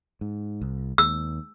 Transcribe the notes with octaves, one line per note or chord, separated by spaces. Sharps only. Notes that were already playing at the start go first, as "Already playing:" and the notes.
G#2
C2
D#2 E6